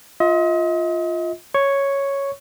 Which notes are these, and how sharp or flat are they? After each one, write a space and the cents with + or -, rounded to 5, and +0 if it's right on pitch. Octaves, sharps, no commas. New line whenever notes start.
F4 +0 D#5 +40
C#5 +0 C#6 +0